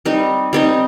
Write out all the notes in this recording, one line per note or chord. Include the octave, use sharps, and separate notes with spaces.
G3 C4 D#4
G3 C4 D#4